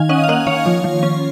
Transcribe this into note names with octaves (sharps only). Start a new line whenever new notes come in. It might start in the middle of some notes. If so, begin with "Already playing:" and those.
Already playing: D#3 F5 G#5
C#4 D#5 F#5
F5
A#3 D#5 F#5
D#3 C#5 F5
F3
F3
C#4